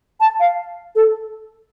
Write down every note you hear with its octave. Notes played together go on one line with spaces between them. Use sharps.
A5
F5
A4